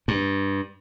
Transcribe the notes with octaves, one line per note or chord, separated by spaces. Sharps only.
G2